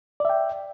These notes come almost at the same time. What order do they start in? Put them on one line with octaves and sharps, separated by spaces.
D5 E5 G5